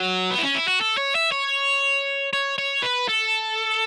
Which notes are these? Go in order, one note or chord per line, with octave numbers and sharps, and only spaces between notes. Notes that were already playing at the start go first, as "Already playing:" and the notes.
Already playing: F#3
B3
E4
C#4
E4
F#4
A4
C#5
E5
C#5
C#5
C#5
B4
A4